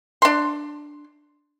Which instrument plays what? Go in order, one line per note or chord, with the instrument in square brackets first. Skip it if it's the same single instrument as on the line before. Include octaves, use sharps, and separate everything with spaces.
[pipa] D4 C6